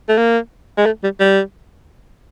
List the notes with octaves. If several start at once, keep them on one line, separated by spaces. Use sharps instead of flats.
A3
A#3
G#3
A3
G3
G3